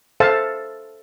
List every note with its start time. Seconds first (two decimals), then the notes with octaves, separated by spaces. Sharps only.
0.20 A4 C5 E5 F5 A5